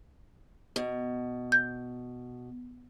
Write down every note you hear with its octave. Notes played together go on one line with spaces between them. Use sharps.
B2
G6